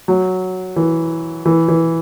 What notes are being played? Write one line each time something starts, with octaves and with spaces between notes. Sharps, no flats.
F#3
E3
E3
E3